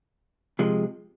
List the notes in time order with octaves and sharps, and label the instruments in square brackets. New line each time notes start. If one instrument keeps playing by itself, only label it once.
[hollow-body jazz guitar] C3 F3 G#3